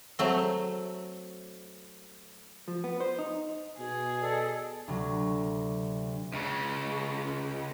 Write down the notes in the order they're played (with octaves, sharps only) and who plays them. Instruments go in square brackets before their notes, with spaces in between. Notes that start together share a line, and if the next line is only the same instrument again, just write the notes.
[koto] F#3 A3 C4
[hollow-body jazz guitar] F3
B3
C5
D#4
[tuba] B2 [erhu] G#4
[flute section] A4 D5 D#5
[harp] D2 C3 F#3
[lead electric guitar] C#2 C#3